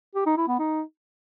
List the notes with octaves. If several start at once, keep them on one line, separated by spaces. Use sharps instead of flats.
G4
D#4
E4
B3
D#4